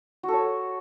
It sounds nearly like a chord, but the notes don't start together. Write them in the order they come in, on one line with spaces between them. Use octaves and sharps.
F#4 A4 C#5